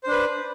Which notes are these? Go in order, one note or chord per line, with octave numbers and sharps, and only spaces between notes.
D4 B4 C5